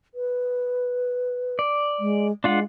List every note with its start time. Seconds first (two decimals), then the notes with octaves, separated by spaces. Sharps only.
0.15 B4
1.59 D5
1.99 G#3
2.44 G#3 D4 F4 F#5